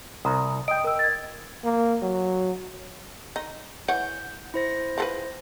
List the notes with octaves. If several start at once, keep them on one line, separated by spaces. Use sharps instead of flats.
C2 A#5 D#6
D#5 G5 D7
A#4 E6
G#6 A6
A#3
F#3
D#4
E3 C#5 F#5 G6
E4 C5 A#6
F3 A4 B4